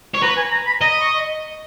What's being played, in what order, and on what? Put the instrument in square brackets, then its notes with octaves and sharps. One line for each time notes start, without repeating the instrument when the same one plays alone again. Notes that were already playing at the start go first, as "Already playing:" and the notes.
[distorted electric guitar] C#5
[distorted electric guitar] B4 [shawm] A#5
[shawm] G#5
A#5
B5
[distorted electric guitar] D#5 [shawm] A#5
[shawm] C#6